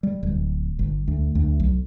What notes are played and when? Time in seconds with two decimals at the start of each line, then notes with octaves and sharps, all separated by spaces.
0.03 G3
0.23 D1
0.79 G1
1.08 D2
1.35 D2
1.60 B1